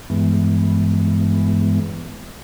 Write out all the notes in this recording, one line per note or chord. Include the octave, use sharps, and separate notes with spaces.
G2 E3 G#3 B3